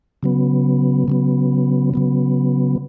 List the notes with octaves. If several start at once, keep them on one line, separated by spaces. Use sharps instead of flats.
C#3 F#3 B3
C#3 F#3 B3
C#3 F#3 B3